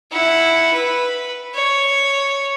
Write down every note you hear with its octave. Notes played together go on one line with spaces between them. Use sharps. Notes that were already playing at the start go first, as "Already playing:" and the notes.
E4 F#5
B4
C#5